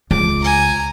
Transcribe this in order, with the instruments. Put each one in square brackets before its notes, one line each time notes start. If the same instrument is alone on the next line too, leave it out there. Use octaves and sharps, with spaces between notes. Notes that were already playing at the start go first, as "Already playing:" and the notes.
[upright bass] C#2 [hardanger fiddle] D6
[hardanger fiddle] G#5 A#5